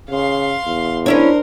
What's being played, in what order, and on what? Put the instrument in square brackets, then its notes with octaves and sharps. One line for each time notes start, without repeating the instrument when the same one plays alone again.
[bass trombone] C#3 [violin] F5 C6
[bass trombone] E2
[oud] C#4 E4 C#5 [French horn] D4 [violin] A#4 C5